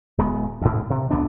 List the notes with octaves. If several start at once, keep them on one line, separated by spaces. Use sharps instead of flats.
D1 G#3 B3
D2 G#2
C3
C#2 F#2 B3 D4